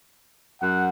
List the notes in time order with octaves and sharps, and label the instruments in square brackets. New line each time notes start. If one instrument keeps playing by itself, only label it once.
[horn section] F#2 F#5